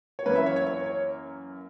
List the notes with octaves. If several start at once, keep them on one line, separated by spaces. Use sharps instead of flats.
C#5
F#2 E3 A#3 B4
E5
C#5
C#5
C#5
C#5